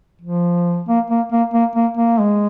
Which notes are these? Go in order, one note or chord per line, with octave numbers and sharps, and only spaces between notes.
F3
A#3
A#3
A#3
A#3
A#3
A#3
G#3